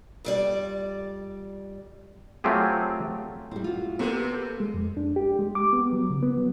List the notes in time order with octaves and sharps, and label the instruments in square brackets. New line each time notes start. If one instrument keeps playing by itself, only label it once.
[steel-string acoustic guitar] F2 G3 D5
[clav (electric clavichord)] F#3 A3 C4 F4 G4 G#4
[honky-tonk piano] A2 G#3 [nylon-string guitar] G3 C4
[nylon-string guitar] F4 F#4
[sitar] C3 [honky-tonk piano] A#3 B3 A4
[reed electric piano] G#3
F2
D4
G4
G#3
D6
B3
F#3
C#3
B3
F#3